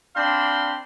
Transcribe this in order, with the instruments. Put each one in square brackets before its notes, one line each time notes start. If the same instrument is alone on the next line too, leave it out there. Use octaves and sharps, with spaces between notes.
[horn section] C4 D4 F5 B5 C6